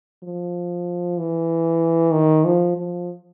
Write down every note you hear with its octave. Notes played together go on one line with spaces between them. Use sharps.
F3
E3
D#3
F3
F3